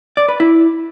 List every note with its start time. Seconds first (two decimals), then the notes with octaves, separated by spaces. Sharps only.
0.17 D5
0.28 B4
0.40 E4